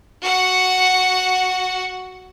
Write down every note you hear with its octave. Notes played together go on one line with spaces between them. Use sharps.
F#4 F#5